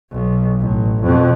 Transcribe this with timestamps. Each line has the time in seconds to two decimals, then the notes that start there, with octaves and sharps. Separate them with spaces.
0.11 B1
0.60 A1
1.03 F2 B2